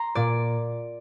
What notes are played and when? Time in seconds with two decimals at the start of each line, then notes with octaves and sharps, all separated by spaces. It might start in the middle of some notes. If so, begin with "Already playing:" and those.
Already playing: A#5 C6
0.15 A#2 D5